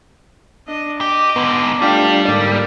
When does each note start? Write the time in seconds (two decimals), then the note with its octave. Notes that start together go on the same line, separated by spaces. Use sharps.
0.67 D4 D#5
1.01 G4 D#5 D6
1.36 G#2 D3 B3
1.82 G3 A3 D4 F4 G4 F5 G5
2.28 G#2 D3 A#3 D5